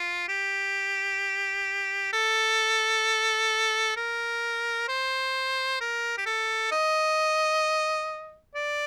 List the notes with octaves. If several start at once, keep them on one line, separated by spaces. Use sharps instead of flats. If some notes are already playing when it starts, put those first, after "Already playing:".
Already playing: F4
G4
A4
A#4
C5
A#4
G4
A4
D#5
D5